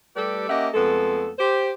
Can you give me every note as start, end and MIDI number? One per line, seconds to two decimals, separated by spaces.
0.16 0.46 55
0.16 0.46 57
0.16 0.46 67
0.16 0.46 69
0.16 0.46 71
0.16 0.46 74
0.48 0.68 58
0.48 0.68 61
0.48 0.68 67
0.48 0.68 75
0.48 0.68 76
0.48 0.68 78
0.74 1.31 41
0.74 1.31 56
0.74 1.31 57
0.74 1.31 59
0.74 1.31 69
1.39 1.72 67
1.39 1.72 72